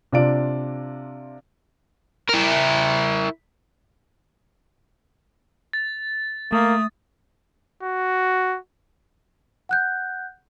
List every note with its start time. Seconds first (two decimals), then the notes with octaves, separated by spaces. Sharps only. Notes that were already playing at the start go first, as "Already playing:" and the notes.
0.13 C3 D4 F4 D5 D7
2.29 E4 A#4
5.73 A6
6.52 A3 A#3 D#6
7.83 F#4
9.69 F#5 F#6 G6